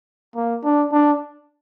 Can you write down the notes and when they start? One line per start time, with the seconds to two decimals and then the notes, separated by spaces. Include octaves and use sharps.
0.36 A#3
0.64 D4
0.92 D4